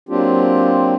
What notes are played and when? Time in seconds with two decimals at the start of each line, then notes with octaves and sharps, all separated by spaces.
0.09 F#3 A#3 C4 D4 F4 G4